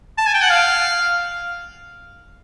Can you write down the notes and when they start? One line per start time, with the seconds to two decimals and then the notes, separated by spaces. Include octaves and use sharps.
0.18 A5
0.26 G#5
0.34 G5
0.42 F#5
0.50 F5